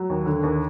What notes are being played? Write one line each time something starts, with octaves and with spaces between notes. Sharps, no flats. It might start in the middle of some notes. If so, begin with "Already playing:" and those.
Already playing: F#3
D#2
D3
D#2